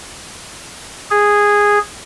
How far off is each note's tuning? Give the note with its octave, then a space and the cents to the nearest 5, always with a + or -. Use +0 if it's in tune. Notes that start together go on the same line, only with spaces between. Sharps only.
G#4 -10